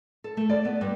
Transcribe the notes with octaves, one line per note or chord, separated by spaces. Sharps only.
A4
A3
D5
B3
G2